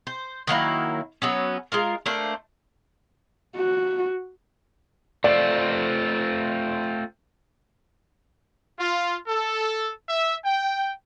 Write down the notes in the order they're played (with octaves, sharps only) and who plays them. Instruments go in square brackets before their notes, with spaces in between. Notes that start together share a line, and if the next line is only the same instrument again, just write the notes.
[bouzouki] C5
D#3 F#3 A#3 E4
F#3 B3 C#4
G#3 F4 A#4
A3 A#3 D4 C5
[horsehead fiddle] F#4
[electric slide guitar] A3 C4 F4 [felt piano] D5
[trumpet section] F4
A4
E5
G5